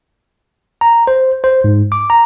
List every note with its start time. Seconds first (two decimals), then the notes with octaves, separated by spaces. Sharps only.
0.81 A#5
1.07 C5
1.44 C5
1.64 G#2
1.92 D6
2.10 A#5